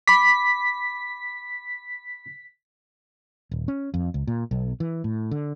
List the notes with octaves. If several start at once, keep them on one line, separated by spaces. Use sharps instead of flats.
B5 D6 B6
D#1
C#4
F2
C#2
A#2
B1
E3
A2
D3